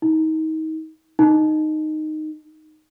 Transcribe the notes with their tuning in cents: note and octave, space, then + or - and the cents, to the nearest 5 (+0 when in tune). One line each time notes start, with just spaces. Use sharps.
D#4 +30
D#4 -10